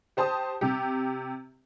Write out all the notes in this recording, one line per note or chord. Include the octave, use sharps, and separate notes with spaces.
G4 C5 A5 D#6
C3 G4